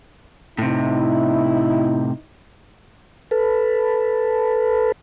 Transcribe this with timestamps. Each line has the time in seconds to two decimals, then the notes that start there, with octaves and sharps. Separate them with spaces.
0.58 A2 C3 D#4 E4
3.31 A4 B4